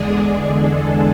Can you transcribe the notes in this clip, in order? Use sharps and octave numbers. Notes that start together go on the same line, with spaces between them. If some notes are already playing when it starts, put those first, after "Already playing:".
Already playing: E2 D3 G#3 D4 G#4
A4